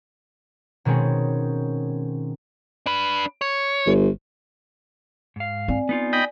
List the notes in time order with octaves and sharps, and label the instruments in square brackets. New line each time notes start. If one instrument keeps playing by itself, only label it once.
[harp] B2 D#3 G#3 C4 C#4
[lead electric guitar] D4 B4
C#5
[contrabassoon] G1
[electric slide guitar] G#2 F5
[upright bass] C4 [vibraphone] D5 G#5
[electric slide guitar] B3 D#4 F4
[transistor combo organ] D#5 G5 B5